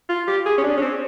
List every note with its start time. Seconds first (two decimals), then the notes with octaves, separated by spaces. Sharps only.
0.09 F4
0.28 G4
0.46 G#4
0.58 C#4
0.64 D4
0.77 C#4
0.82 C4